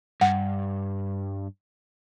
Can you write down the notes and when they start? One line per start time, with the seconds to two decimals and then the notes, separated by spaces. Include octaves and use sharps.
0.21 G2 F#5